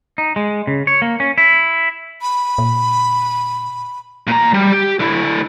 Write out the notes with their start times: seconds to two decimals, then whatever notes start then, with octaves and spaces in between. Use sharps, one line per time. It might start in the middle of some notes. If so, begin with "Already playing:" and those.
0.18 D#4
0.36 G#3
0.67 C#3
0.87 C#5
1.02 A#3
1.20 C#4
1.38 E4
2.22 B5
2.58 A#2
4.27 A#2 A#5
4.54 G3
4.72 G4
5.00 D3 E4